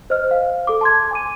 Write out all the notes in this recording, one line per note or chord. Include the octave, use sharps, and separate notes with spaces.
C5 D#5 F6
F5
A4 D6
A5 C6 G#6
G#5 D6 D#7